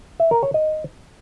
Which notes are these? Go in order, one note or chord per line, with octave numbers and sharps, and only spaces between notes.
E5
A#4
C#5
D#5